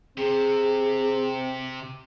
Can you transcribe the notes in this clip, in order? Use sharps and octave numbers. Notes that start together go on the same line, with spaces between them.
C3 C4 G#4